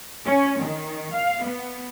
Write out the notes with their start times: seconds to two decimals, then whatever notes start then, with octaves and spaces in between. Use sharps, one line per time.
0.24 C#4
0.60 D#3
1.13 F5
1.42 B3